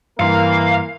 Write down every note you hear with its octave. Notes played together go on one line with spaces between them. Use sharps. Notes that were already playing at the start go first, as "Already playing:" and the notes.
G2 E3 A#3 A#4 F5 C6